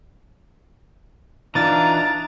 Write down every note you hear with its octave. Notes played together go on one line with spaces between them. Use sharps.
E3 D4 D#4 F4 A#5 A6